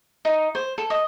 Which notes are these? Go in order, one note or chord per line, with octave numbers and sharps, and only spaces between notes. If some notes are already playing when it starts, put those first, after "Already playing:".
D#4
C5
A4
D#5